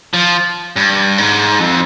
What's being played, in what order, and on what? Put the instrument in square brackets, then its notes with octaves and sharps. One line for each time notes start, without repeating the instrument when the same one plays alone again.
[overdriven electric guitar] F3
G2
G#2
F2